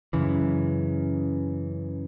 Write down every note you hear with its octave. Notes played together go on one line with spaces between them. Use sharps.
F#2 C#3 E3